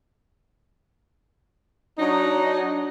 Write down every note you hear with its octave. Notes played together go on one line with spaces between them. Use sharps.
F#3 D4 D#4